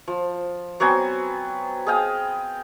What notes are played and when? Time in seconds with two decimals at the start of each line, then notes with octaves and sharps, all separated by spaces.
0.08 F3
0.80 F#3 B3 C4 G#5
1.86 G#4 D#5 F5 G5